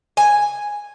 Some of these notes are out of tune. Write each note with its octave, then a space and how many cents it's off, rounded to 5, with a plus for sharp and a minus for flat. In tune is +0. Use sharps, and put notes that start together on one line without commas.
G#5 -5